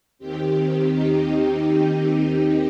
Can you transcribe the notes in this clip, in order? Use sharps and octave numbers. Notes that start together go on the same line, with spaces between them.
D#2 D#3 C4 G4
D#4